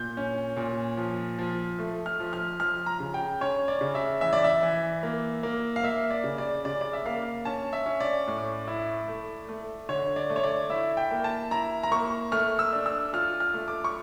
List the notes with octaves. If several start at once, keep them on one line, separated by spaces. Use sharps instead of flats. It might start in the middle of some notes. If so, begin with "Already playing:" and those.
Already playing: A#2 G6
C#4
A#2
F3
F3
A3
F6
F3
F6
F3 F6
A#5
C#3
G5
C#4 C#5
D5
C#3
E5
E3 E5
D5
E5
E3
A#3
A#3
F5
A#3 E5
D5
C#3
D5
C#3 D5
D5
E5
A#3 F5
C#4 A5
E5
C#4
D5
A2
E4
A3
A3
D3 C#5
D5
A3
C#5
D5
E4 E5
G5
A#3
A5
E4 A#5
A#5
A#3 C#6
A3 F6
E6
D4
E6
F4 F6
F6
A3
D6
C#6